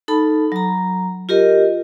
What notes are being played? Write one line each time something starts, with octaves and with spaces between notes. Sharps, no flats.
D#4 A4 A5 B5
F#3 A#5
F4 G4 A#4 D#5